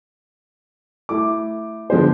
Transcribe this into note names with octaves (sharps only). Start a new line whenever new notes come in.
A3 E4 D6
D3 F3 G#3 B3 G#4 C5